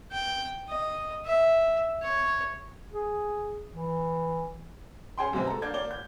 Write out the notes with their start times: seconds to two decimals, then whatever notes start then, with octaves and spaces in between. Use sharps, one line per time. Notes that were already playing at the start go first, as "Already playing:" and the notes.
0.12 G5
0.68 D#5
1.25 E5
2.02 C#5
2.92 G#4
3.71 E3
5.18 C#4 G#4 G5 C6
5.33 F#2 B2 G#3 C4
5.47 A4 A#5
5.62 A#3 D4 G6 G#6
5.73 A#3 C#5 D5 G7
5.91 G6